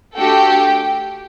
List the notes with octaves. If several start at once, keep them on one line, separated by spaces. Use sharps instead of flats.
A3 D4 F#4 G4 A4 G5